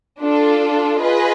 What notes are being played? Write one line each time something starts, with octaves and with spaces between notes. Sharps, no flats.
D4 F4 A4
F4 G#4 B4 D#5